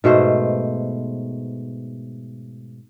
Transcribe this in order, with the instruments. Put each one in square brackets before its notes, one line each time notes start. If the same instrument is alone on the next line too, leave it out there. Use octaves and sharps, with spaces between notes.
[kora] G#2 B2 A3 C5